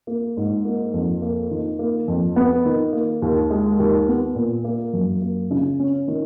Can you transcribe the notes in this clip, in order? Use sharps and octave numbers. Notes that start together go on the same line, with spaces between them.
A#3
G#2
A#3
F2
A#3
D#3
A#3
F2
B3
D#3
A#3
D#2
G#3
D#2
B3
A#2
A#3
F#2
A#3
C#3
C#4
D#3